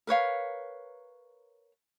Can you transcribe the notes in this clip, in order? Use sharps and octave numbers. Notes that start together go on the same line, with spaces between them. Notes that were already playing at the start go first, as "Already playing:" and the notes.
A#4 B4 C#5 F5